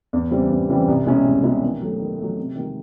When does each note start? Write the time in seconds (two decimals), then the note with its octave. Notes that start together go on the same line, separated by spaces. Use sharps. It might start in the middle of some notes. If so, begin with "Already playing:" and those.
0.13 E2
0.31 C#3 E3 G3 C4
0.50 E2
0.69 C#3 E3 G3 C4
0.88 C2
1.06 B2 G#3 C#4 E4
1.25 C2
1.43 B2 G#3 C#4 E4
1.62 D#3
1.82 F#3 A3
1.99 D#3
2.18 A3
2.23 F#3
2.37 C3
2.56 D#3 G#3